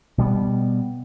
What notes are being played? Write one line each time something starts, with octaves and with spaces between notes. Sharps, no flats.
B2 G3 B3